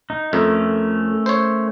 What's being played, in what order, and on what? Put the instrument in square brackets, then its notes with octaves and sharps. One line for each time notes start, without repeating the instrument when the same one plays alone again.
[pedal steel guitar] D#4
[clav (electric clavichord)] F2 [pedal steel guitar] A3 C#4 A#4
[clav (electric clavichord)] C5 C#5